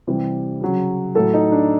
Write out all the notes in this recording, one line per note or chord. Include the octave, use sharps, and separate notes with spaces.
C3 E3 G3
C#3 F#3
A2 F#3 A4
D#4
D4